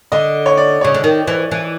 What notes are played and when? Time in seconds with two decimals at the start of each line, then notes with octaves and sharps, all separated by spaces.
0.12 D3 D#5
0.46 C#5
0.57 D5
0.81 C#3 C#5
0.94 D3
1.04 D#3
1.28 E3
1.51 E3